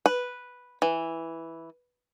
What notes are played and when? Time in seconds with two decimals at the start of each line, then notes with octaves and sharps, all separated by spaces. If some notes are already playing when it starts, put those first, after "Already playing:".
0.06 B4
0.82 E3